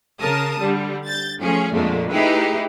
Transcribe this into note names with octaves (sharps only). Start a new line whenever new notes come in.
C#3 A#4 A5 D#6
D3 G3
G6 A6
F3 A3 C#4 G#4
F2 A#2 D3 G#3 A3
A3 D#4 E4 G4 G#4 B4